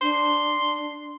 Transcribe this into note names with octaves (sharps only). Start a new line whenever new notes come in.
D4 C6